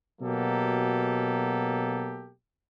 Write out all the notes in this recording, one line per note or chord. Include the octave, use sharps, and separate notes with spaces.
B2 F#3 A#3 G4 A4